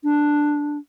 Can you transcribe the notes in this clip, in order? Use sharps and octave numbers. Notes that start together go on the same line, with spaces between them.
D4